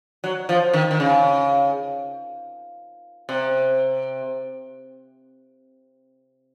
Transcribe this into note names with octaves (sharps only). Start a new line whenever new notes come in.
F#3
F3
D#3
D#3
C#3
C3